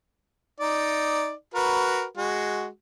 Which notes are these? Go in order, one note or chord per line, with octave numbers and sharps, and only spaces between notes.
D#4 D5
F#4 A#4 B4
G#3 F#4